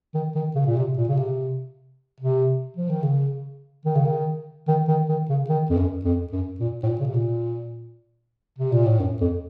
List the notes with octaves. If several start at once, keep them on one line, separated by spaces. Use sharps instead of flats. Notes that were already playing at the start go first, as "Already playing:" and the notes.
D#3
D#3
C#3
A#2
C3
A#2
C#3
C3
C3
F3
D#3
C#3
D#3
C#3
D#3
D#3
D#3
D#3
C#3
D#3
F2
F#2
F2
F#2
A#2
A2
A#2
C#3
C3
A#2
C3
A#2
A2
F#2
F2